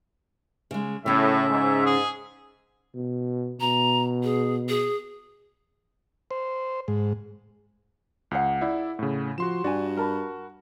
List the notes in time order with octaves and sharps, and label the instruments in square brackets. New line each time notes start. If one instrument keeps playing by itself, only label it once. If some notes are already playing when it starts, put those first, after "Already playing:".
[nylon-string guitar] C#3 G#3
[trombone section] A2 [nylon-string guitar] C#3 C#4 [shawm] E5
[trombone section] G#2
[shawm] G#4
[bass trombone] B2
[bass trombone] B2 [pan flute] A#5
[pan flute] G#4
G#4
[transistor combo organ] C5
G#2
[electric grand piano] C#2 [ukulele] G#4 F5 F#5
[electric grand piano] E4 D5 E5
A2 C#3
[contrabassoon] F3 [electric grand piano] F#4 C6 E7
[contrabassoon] G2 [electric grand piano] F#4 [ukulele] D5 G#5
[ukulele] A#4 A5 B5